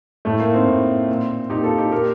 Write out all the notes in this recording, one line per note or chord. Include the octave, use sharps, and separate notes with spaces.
A2 A3
A#3
C4 D#4
A2
A#2
A#2 D#4 G4
F4 A4
D#4 G4
A#2 G4 A#4